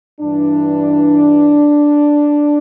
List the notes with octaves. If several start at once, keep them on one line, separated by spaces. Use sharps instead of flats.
G2 E3 D4